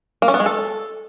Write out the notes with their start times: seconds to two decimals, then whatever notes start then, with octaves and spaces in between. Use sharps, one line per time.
0.22 A#3
0.28 C#4
0.34 B3
0.40 G#3
0.46 A4